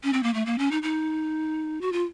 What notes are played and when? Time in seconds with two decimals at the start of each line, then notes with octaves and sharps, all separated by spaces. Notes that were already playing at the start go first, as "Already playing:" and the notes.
0.04 C#4
0.13 C4
0.23 A#3
0.34 A3
0.46 A#3
0.58 C#4
0.71 D#4
0.83 D#4
1.81 F#4
1.92 F4